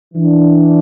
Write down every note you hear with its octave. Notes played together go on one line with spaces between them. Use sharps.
E3 D4